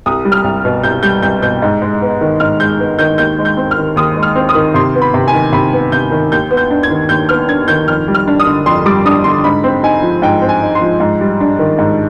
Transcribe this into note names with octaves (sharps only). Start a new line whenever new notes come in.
C2 D#6
G3
F6
C2
B2
C2 G6
G3 G6
C2 G6
B2 G6
G#2
G#3
B3
D#3
G#2 F6
G#3 G6
B3
D#3 G6
D#2 G6
G#3
G6
C4
F6
D#3
D#2 D#6
G#3
F6
C4
D#6
D#3
C3 C6
B3
B5
C3
G#5
D#3
C3 B5
B3
C3 G6
D#3
D#2 G6
B3
G6
D4
G#6
D#3
D#2 G6
B3 F6
D4 G#6
D#3 G6
F2 F6
G3
F6
D4
D#6
D3
F2 C6
G3 D6
D4 D#6
D3 C6
G#2 B5
C4
D#4 G#5
F3
G#2 G5
C4
G#5
D#4
C6
F3
G#2
G3
D4
D#3
G#2